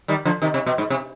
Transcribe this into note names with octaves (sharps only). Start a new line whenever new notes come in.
D#3 G3
D3 F3
C3 D#3
C3
B2
G#2
C3